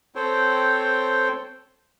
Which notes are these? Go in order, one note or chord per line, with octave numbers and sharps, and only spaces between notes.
C4 A4 C5 C#5 G5